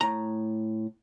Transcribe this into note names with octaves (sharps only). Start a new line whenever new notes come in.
A2 A#5